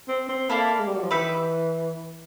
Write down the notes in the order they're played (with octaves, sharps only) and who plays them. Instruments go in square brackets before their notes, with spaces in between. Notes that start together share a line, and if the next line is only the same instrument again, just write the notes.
[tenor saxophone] C4
C4
[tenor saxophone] A#3 [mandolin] E4 A4 D5 F5
[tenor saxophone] G#3
G3
F#3
F3
[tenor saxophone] E3 [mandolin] D#4 G4 B4 E5